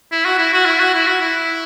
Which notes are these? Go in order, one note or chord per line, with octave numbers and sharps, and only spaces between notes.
E4
F#4
E4
F#4
E4
F#4
E4
F#4
E4